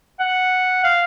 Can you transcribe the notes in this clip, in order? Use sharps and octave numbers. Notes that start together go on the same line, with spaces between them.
F#5
F5